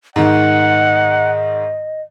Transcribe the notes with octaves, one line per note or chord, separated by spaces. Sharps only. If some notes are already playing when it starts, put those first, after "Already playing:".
G#2 D#3 D#5 F#5